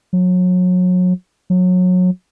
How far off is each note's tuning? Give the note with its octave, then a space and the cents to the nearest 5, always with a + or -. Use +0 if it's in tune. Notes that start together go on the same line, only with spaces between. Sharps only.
F#3 -30
F#3 -25